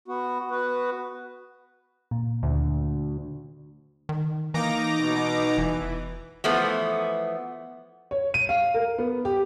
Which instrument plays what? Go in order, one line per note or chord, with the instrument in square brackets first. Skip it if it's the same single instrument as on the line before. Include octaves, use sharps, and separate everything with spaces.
[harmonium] B3 F#4
B3 F#4 B4
[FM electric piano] A#2
[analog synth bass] D2
D#3
[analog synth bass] E3 [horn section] A#3 [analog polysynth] D#4 A#5 D6
[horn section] B2
[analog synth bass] F1 [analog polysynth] E3
[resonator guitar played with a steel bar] E3 F3 A3 B3
[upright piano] C#5
D#7
F5
A#4
B3
G4